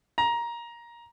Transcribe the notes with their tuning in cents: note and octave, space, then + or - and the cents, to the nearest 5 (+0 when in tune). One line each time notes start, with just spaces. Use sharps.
A#5 +15